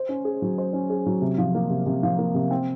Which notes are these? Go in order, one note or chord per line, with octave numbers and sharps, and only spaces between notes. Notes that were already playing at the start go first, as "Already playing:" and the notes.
Already playing: C5
C#4
G#4
F#3
C5
C#4
G#4
F#3
C3
F3
A#3
C3
C3
F3
A#3
C3
C4